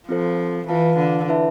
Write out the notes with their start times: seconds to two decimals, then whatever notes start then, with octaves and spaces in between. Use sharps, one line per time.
0.08 F3 C4 F4 A4 C5
0.68 E3 F4 B4 F5 A5
0.98 D3
1.28 E4 B4 E5 A5